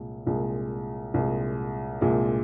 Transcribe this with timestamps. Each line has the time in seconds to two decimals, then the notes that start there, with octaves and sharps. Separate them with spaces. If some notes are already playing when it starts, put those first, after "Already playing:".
Already playing: C2 A#2 G#3
0.26 C2 A#2 G#3
1.14 C2 A#2 G#3
2.01 C2 A#2 G#3